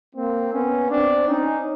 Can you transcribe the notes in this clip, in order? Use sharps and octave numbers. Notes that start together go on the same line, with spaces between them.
A#3 C4
B3 C#4
C4 D4
C#4 D#4